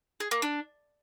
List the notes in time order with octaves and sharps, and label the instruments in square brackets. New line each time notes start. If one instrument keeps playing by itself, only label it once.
[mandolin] G#4
A#3
D4